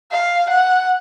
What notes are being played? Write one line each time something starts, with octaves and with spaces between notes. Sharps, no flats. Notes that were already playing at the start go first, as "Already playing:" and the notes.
F5
F#5